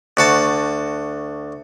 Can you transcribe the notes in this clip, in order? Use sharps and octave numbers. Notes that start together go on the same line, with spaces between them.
D2 F#4 A5